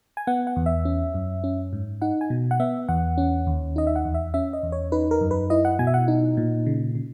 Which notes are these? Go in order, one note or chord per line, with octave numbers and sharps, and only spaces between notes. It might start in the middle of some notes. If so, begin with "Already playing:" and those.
G#5
B3 F#5
F#5
E2
E5
C#4
F#2
C#4
G#2
D#4 F#5
G#5
B2
F#5
B3 E5
E2 F#5
C#4
D#2
D#4 D#5
E5
F#5
E2
E5
C#4 E5
D#5
E2
C#5
D#4 B4
A#4
F#2
B4
E4 D#5
F#5
B2 G#5
E5
F#5
D#4
A#2
C#3
C#3